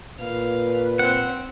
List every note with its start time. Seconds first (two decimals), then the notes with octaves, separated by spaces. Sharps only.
0.20 A#2 B4 F5
0.99 C4 F#5